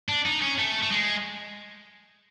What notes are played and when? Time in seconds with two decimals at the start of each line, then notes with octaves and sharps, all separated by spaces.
0.09 D4
0.25 D#4
0.42 C#4
0.58 A3
0.83 A3
0.91 G#3